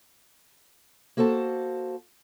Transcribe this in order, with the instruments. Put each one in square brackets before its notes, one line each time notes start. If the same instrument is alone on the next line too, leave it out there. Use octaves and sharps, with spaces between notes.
[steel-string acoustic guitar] A#3 F#4 A4 C5 A5